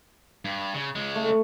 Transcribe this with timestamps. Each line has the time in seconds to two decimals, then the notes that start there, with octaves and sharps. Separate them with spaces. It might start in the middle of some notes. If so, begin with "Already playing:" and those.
0.45 G2
0.74 C#3
0.95 C#3 G#3
1.15 A3